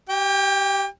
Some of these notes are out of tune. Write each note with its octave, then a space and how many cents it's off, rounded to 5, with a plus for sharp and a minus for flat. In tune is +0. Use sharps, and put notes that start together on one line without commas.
G4 -20 G5 +30